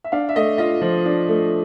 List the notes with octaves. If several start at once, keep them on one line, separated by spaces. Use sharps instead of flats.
E5
D4 F5
E5
A3 D#5
F4 D#5
F3
D4
A3